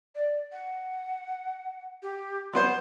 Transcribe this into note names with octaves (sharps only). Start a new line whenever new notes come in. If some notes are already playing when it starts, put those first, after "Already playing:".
D5
F#5
G4
F#3 B3 C5 C6